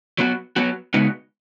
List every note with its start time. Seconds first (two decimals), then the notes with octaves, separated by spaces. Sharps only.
0.18 F#3 B3 F#4
0.56 F#3 B3 F#4
0.94 C#3 G#3 B3 D#4 F#4